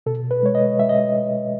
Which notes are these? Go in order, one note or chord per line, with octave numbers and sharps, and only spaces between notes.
B2 A4
B4
G#3 C#5
D#5
G#3 E5
D#5